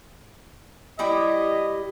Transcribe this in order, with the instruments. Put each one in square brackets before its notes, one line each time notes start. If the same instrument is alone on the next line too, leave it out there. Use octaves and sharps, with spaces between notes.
[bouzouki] G3 E4 G4 [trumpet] D#5